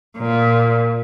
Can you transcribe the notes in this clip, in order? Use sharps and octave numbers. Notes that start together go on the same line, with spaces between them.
A#2